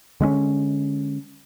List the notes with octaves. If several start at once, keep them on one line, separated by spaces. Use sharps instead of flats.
D3 G#3 A3 C#4